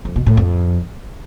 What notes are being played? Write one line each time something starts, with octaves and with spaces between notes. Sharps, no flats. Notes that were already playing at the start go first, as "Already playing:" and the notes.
F2
B2
A2
F2